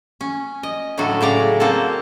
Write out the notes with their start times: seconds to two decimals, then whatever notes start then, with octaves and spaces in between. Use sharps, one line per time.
0.21 C#4
0.63 D#5
0.98 A2 D3 F#3 F#4 A4
1.21 A2 C#3 D5 A#5
1.60 A#3 C4 F4 F#4 A4 A5